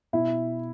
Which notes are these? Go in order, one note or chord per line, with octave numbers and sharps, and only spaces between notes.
B2 E4